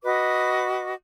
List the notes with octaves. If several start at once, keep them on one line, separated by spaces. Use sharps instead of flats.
F#4 B4 D#5 D6